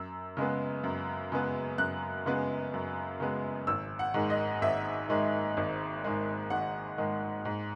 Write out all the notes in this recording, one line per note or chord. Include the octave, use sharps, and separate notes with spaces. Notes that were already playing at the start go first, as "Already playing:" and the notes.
Already playing: F#2 E6
C#3 G#3 B3
F#2
C#3 G#3 B3
F#2 F#6
C#3 G#3 B3
F#2
C#3 G#3 B3
G#1 E6
F#5
G#2 D#3 G#3
D#5
G#1 E5
G#2 D#3 G#3
G#1
G#2 D#3 G#3
G#1 F#5
G#2 D#3 G#3
G#2